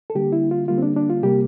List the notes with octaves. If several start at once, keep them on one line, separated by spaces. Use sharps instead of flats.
A4
D3 G3 A#3 G4
E4
F4
D3 G3 A#3 F4
C4
D4
D4
F4
C3 G3 A#3 G4